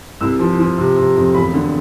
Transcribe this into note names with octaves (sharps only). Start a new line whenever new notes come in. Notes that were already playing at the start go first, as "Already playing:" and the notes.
C2 E6
F3
F3
C3
C3
F2
E1 B5
D3